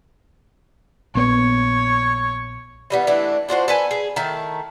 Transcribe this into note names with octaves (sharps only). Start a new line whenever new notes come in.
A#1 B3 C#5
E3 G3 B3
E3 A3 D4
D4 F4 F#4 C5
A4 B4 G#5
G#4
D#3 A3 E4 A5